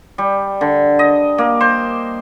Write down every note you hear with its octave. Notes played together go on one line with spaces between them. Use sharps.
G3
D3
D#5
A#3
C5